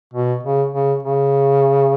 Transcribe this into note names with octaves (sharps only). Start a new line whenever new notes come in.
B2
C#3
C#3
C#3